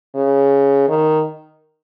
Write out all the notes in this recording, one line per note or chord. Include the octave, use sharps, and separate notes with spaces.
C#3
D#3